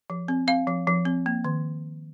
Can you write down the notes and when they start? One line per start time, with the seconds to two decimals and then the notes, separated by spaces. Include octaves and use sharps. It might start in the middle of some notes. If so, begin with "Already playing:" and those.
0.10 F3
0.28 C4
0.47 C4 F5
0.67 F3
0.87 F3
1.05 C4
1.26 A#3
1.44 D#3